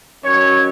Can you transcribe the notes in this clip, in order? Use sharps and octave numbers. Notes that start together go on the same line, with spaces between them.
D#3 F#3 C#4 C#5